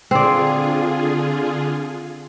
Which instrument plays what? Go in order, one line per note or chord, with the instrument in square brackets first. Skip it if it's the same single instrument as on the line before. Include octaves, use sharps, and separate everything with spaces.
[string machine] D3 F4 G#4 [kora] C4 D5